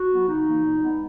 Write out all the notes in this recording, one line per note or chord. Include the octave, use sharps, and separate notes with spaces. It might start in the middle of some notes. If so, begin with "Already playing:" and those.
Already playing: F#4
F#3 B3
C#3 D#4
E3 A#3
A#2
G#3 B3